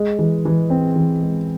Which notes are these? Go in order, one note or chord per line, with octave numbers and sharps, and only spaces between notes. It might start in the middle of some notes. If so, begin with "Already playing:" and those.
Already playing: G#3
E3
E3
C4
E3
G#3